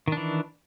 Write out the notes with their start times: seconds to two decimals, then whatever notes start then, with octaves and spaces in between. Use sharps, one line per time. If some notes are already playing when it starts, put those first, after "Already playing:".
0.08 D#3
0.12 D4
0.17 E3